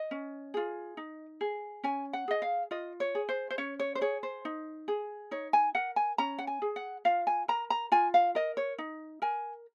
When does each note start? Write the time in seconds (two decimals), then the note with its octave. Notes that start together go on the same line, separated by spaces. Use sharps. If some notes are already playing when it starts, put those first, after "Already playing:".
Already playing: D#5
0.11 C#4
0.54 F4 G#4
0.97 D#4
1.41 G#4
1.84 C#4 G#5
2.13 F#5
2.28 G#4 D#5
2.42 F5
2.71 F4 D#5
3.00 C#5
3.15 G#4
3.29 C5
3.51 C5
3.58 C#4 C#5
3.80 C#5
3.95 C5
4.01 G#4 C#5
4.23 C5
4.45 D#4
4.88 G#4
5.31 D#4 C#5
5.53 G#5
5.75 A#4 F#5
5.96 G#5
6.18 C#4 A#5
6.39 F#5
6.47 G#5
6.62 G#4
6.76 F#5
7.05 F4 F5
7.27 G#5
7.48 A#4 A#5
7.70 A#5
7.92 F4 G#5
8.14 F5
8.35 A#4 D#5
8.57 C#5
8.78 D#4
9.22 A#4 G#5